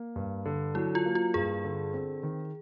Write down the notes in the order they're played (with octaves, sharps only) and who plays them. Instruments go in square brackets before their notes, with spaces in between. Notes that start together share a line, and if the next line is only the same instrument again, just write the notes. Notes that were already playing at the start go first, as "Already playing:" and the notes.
Already playing: [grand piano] A#3
G2
D3
[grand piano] F#3 [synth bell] E4
[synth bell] F4
[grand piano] A#3
[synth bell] F4
[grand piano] G2 [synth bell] G#4
[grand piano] D3
C4
D#3